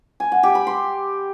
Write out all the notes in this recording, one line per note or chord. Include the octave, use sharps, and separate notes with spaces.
G#5
F#5
G4
B5
C6